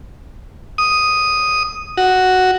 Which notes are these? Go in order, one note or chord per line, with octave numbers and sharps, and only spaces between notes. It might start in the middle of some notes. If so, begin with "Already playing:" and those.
D#6
F#4